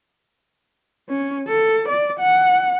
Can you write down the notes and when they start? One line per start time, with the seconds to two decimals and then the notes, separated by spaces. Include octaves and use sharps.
1.09 C#4
1.47 A4
1.88 D5
2.19 F#5